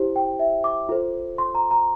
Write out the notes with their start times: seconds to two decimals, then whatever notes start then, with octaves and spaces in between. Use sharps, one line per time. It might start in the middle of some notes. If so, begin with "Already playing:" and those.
Already playing: E4 G4 C5
0.16 G5
0.39 E5
0.64 D6
0.89 F4 A4 C5
1.38 C6
1.55 A#5
1.71 A#5